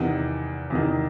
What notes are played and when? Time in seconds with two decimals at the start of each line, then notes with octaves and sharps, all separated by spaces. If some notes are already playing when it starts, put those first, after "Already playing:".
Already playing: E2 C3 D#3 F#5
0.70 E2 C3 D#3